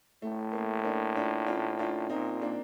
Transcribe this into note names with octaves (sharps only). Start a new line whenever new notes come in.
A2 A3
A#3
A#3 D4
D4 F4
D4 F4
D4 F4
A#2 C4 D#4
A#3 D4